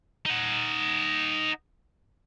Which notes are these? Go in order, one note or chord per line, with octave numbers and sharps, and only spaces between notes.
D#4 F#5